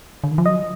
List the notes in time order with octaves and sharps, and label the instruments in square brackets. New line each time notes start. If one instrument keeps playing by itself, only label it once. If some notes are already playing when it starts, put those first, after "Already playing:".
[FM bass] D3
D#3
F3
[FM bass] F#3 [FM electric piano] D#5